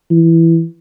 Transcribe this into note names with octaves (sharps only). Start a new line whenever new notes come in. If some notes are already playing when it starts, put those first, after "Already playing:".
E3